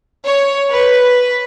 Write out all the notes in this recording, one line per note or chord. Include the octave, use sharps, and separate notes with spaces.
C#5
B4